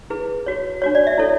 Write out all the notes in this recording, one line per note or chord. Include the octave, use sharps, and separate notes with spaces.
E4 G#4 B4
F#4 C#5
D4 F#4 C#5
D5
E5
E4 A4 C#5